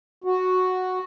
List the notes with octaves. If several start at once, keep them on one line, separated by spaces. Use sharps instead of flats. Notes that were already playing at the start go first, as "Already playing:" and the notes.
F#4